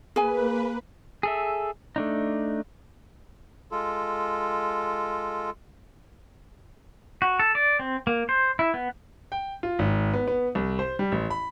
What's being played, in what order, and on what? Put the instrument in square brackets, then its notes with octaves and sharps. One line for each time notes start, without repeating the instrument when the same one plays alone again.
[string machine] A#3 B4 [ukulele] G#4 G#5
[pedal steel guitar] G#4 A4 E5
A3 D4 D#4
[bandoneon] G#3 F4 A4
[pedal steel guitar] F#4
A4
D5
C4
A#3
C5
E4
B3
[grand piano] G5
F4
G#1
B3
B3
C2
C5
G3
A1
B5